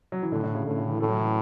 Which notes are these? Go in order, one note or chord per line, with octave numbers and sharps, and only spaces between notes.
F#3
E3
A2 D3
D3
C#3
A2 D3
C#3
E3
A2 A3
F#3
E3